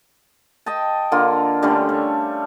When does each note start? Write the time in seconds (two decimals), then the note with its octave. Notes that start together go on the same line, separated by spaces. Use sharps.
0.66 D#5 G5 A5
1.12 D3 A#3 F4
1.62 D3 G3 A3 C#4
1.89 C#5